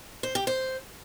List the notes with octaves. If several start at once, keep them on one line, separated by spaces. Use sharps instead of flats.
C5
G4
C5